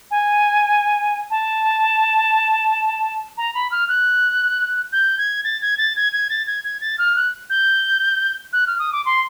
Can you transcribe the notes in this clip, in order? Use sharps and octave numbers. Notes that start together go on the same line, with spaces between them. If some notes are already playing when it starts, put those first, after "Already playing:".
G#5
A5
A#5
B5
F6
F#6
G6
G#6
A6
G#6
A6
G#6
G#6
A6
G#6
G#6
A6
F6
F#6
G6
F#6
F6
D#6
D6
C6